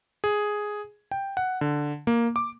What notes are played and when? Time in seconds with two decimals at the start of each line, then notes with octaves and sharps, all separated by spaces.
0.24 G#4
1.11 G5
1.37 F#5
1.61 D3
2.07 A#3
2.36 D6